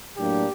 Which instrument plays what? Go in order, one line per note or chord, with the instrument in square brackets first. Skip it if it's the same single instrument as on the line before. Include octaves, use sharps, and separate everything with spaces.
[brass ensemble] A2 F#3 A#3 D4 [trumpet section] G4